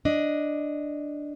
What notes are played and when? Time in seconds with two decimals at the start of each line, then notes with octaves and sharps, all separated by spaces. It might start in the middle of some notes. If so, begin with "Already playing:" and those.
0.05 D4 D#5